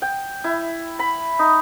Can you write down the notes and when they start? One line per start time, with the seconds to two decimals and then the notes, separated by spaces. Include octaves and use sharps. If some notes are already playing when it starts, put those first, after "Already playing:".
0.02 G5
0.44 E4
0.99 B5
1.39 D#4